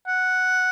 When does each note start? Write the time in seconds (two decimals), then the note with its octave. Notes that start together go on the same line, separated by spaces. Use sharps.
0.07 F#5